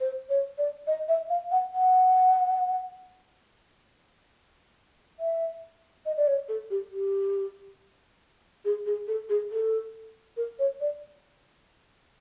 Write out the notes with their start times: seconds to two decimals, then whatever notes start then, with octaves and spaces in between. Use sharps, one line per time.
0.01 C5
0.29 C#5
0.58 D5
0.87 D#5
1.08 E5
1.30 F5
1.51 F#5
1.73 F#5
5.20 E5
6.06 D#5
6.17 D5
6.27 C#5
6.49 A4
6.71 G4
6.92 G4
8.65 G#4
8.86 G#4
9.08 A4
9.29 G#4
9.51 A4
10.37 A#4
10.59 C#5
10.80 D5